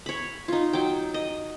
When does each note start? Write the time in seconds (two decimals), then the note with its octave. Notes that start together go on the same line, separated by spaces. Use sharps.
0.06 C#5 B5
0.48 D#4 F4
0.73 F#3 G5
1.14 D#5